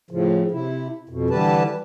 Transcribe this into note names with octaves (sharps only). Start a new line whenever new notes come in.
A2 C#3 F3
C3 E4
F2 B2
D3 E3 G3 G4 B4 A5